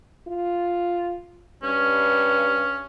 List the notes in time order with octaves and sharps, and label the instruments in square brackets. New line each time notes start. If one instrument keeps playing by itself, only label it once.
[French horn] F4
[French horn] G2 [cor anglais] C#4